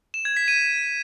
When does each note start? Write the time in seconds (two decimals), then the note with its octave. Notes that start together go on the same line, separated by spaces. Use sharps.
0.14 E7
0.25 G#6
0.37 B6
0.48 D#7